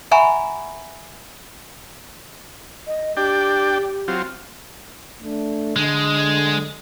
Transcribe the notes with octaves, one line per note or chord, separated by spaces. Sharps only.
E5 F#5 G#5 A#5 B5 C#6
D#5
D4 G4 G5
F#3 C4 F4
A3 D4
D3 G#3